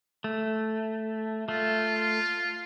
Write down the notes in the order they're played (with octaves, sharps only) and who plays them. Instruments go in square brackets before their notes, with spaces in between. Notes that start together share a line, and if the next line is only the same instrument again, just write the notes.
[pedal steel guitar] A3
[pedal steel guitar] A3 [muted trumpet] F4